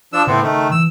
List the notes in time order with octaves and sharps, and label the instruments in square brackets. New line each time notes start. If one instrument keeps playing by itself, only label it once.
[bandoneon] F3 D4 E6
[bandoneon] A2 B3 C4 [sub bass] C#3
[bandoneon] D#3 A3
[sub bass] E3 [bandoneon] E6